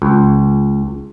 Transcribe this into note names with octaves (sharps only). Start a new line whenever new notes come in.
C#2